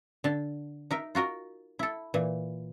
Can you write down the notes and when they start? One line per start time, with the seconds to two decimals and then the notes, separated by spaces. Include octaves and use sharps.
0.24 D3 A5
0.91 D#4 A#4 E5
1.15 F4 F#4 A#4 D#5
1.79 E4 A4
2.14 A#2 E3